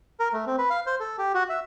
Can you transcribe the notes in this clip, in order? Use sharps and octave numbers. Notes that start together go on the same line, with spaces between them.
A#4
A3
C4
B4
F5
C5
A4
G4
F#4
E5